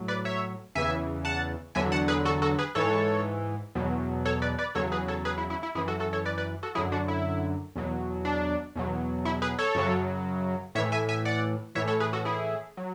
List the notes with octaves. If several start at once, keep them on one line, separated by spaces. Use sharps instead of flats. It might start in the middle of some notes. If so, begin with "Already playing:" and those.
Already playing: A2 F#3
B4 D5
C#5 E5
E2 C#3 E3 E5 G#5
F#5 A5
E2 D3 F#3 E5 G#5
F#5 A5
G#4 B4
F#4 A4
F#4 A4
G#4 B4
G#2 E3 A4 C#5
E2 B2 F#3
A4 C#5
B4 D5
B4 D5
E2 C#3 F#3 A4 C#5
G#4 B4
A4 C#5
G#4 B4
E4
E4
E4
F#2 E3 E4 G#4
F#4 A4
F#4 A4
A4 C#5
B4 D5
B4 D5
F#4 A4
F#2 D3 F#3 E4 G#4
D4 F#4
E4
E2 B2 F#3
D4
E2 B2 F#3
E4
G#4 B4
A4 C#5
F#2 C#3 F#3
A2 E3 C#5 E5
E5 G#5
E5 G#5
D5 F#5
A2 E3 C#5 E5
A4 C#5
G#4 B4
F#4 A4
E4 G#4
F#3